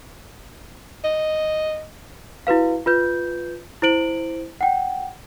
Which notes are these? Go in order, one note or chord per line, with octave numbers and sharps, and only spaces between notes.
D#5
E4 F#4 B4 F5
F4 B4 G6
E4 C5 D7 F#7
F#5 G5